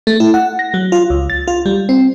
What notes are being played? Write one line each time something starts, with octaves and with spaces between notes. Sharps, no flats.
A3
E4
F#5
A#6
F#3
F4
C#2
A6
F4
G3
C4